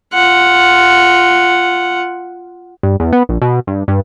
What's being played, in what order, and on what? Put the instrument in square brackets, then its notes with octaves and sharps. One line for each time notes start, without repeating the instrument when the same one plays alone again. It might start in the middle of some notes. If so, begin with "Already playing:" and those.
[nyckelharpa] F4 F#5
[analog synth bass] G2
E2
B3
A#1
B2
G2
G2